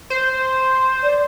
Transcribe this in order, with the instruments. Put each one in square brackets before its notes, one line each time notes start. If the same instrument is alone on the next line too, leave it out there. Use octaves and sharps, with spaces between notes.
[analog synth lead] C5
[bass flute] D5